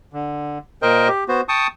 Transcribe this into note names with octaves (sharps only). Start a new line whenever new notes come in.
D3
A#2 A#4 C5 D#5 G5
G4
B3 F#4 C5
G5 A5 C#6 D#6